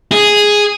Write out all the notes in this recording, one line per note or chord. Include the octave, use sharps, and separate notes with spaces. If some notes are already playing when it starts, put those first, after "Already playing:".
G#4